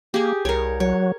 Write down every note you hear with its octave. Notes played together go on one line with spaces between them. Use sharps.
A#3 G4 G#4
C2 A#4 C#5
F#3 C#5